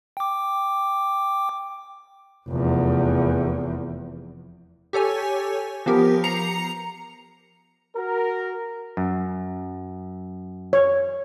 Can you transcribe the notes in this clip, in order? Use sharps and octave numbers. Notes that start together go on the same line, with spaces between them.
G5 D6
F1 E2
G4 A4 C#5 G#5
F3 B3 G4 A#4
A#5 C7 C#7 F7
F#4 A#4
F#2
C#5